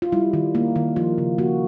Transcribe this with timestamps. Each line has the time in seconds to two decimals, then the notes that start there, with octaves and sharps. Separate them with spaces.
0.02 F4
0.12 G3 E4
0.33 D#3
0.55 A#3
0.76 D#3
0.96 F3 F4
1.18 C#3
1.38 A#3 F#4